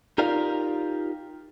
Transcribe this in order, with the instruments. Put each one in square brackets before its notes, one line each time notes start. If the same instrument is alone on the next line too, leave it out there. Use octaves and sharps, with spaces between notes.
[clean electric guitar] D#4 F4 G4 A#4 D5 F5